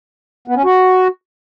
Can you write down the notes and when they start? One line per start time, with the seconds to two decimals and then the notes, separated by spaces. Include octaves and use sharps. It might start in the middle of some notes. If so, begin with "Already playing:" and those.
0.48 B3
0.56 C#4
0.64 F#4